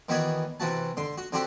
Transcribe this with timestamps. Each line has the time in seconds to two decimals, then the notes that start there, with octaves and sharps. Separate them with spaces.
0.09 D#3 E3 B3 F#4 C#5 D5
0.60 C3 E3 F#4 A5
0.97 D3 C6
1.18 F#4
1.32 D3 C4 D4 F#4 G4 A4